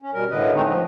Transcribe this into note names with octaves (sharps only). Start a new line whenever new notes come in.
C#4
B2 G3 A#4
A2 D3 B4 D#5
G#3 A3 C4 D4 D#4
F3